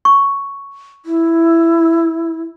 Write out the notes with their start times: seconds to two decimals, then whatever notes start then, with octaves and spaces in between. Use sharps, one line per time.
0.05 C#6
1.06 E4